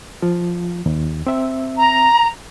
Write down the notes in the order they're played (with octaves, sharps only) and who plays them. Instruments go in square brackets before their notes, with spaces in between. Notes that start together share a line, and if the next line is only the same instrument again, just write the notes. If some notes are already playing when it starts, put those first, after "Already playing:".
[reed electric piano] F3 F4
D#2
C4 E5
[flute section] A#5